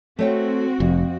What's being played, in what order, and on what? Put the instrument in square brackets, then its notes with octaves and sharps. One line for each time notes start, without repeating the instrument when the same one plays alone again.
[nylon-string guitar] A3 C#5 G5 [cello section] C4 F#4
[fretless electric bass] F1 [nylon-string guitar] F2